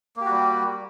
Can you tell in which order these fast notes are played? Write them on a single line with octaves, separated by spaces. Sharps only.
A#3 G4 F#4 G3